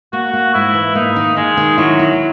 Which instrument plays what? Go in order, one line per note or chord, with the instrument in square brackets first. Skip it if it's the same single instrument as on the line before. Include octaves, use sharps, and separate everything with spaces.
[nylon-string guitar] A#3 [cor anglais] F#4
[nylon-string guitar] A#3
[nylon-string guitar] G#2 [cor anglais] E4
[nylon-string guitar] E3
[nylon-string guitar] A#3 [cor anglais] D#4
[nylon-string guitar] D#3
[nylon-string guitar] D#3 [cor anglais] G#3
[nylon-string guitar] D#3
[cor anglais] F#3 [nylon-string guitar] E4
[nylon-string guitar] E4